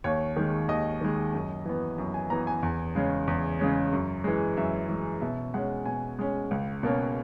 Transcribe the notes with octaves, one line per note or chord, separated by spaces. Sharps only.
D#2 C#5
D#3 G#3
D#2 D#5
D#3 G#3
F#2
E3 B3
F#2
G#5
E3 B3 A#5
G#5
E2
C#3 G#3 C#4
E2
C#3 G#3 C#4
F#2
E3 G#3
F#2 E5
E3 G#3
B2 E5
G#3 C#4 F#5
B2 G#5
G#3 C#4
C#2
B2 A#3 C#4